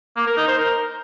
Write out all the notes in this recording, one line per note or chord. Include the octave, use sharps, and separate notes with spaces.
A#3
A#4
D#4
C5
A#4